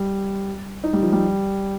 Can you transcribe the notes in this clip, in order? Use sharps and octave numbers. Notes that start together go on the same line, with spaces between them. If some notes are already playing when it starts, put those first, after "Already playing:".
Already playing: G3
D#4
G3
F3
G3